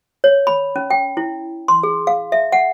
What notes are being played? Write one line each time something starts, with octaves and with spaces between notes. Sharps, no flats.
C#5
B5
C#4
G5
E4
C6
G#4
F5
E5
F#5